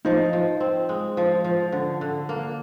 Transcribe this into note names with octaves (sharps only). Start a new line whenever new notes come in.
F3 D#4
F3
C4
G#3
F3
F3
D3
D3
A#3